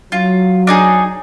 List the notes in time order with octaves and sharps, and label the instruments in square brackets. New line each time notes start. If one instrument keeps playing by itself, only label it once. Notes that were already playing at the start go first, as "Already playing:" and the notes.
[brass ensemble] F#3 [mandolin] F4
[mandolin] D4 D#4 G#4